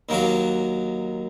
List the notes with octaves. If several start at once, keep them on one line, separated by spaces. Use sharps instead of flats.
D#2 D#3 F#3 A#3 F#4